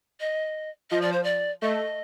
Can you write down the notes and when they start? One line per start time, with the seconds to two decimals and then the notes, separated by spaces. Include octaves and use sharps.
0.20 D#5
0.90 F3 D#5
1.01 D5
1.12 C5
1.24 D5
1.62 A3 D#5